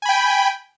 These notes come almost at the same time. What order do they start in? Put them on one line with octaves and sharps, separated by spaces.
G#5 B5 G5